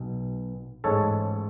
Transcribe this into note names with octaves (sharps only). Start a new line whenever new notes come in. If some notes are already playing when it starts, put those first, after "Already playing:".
Already playing: B1 B2
A1 G#2 G#3 A4 C#5